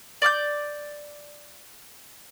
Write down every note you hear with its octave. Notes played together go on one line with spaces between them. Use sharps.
D5 D6 F#6 G6